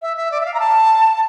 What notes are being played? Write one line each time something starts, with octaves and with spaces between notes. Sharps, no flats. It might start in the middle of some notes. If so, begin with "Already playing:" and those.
E5
E5
D5
E5
F5
A#5
A5